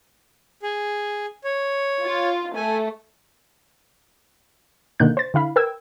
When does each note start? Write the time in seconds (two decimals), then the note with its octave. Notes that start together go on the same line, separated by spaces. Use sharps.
0.63 G#4
1.44 C#5
2.05 F4
2.56 A3 G#5
5.00 B2 D3 D#3 A#3 F#6 G6
5.17 C5 A6
5.34 D3 E4 F5 B5
5.56 A#4 B4 G5 E6 G#6